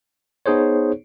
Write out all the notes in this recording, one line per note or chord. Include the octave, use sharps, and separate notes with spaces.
B3 D#4 G#4 C5 C#5